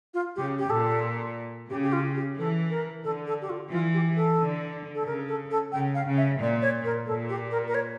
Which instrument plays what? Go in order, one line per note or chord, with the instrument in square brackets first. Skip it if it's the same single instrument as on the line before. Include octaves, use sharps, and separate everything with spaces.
[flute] F4
[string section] C#3 [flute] G4
[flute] G4
[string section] A#2 [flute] A4
[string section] C#3 [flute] G4
[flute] G4
F4
G4
[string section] E3 [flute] A4
[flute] A#4
[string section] D3 [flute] A4
[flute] A4
G4
F4
[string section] E3 [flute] F4
[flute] G4
A4
[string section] D3
[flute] A4
[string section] C#3 [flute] A#4
[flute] A4
A4
[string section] C#3 [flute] G5
[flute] F5
[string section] C#3
[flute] E5
[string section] A#2 [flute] D5
[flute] C#5
A#4
[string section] A#2 [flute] A4
[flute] G4
A#4
A#4
C#5